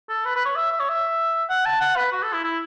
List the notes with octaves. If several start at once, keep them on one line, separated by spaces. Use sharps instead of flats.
A4
B4
B4
C#5
E5
E5
C#5
E5
F#5
A5
F#5
B4
F#4
A4
E4
E4